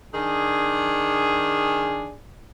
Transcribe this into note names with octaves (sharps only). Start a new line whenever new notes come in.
D#3 D4 G#4